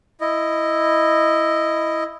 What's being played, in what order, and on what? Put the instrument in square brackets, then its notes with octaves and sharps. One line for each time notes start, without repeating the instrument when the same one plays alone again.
[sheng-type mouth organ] E4 D#5